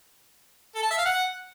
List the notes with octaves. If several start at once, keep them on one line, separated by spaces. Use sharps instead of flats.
A4
A5
E5
F5
F#5